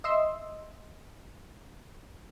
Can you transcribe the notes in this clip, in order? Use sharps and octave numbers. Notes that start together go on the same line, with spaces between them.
D#5 E5 C6 E6